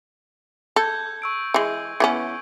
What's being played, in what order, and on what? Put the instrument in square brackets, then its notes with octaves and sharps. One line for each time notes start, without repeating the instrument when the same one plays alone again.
[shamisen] A4 [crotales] G6 G#6
[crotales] C#6 E6 D7
[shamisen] E3 G#3
E3 B3 C#4